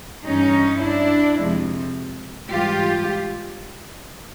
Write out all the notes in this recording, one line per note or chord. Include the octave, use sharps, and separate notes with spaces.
G2 E3 G3 C#4 D#4
D4 E4
F2 C3 F3 G#3
G#2 E3 G3 F4 G4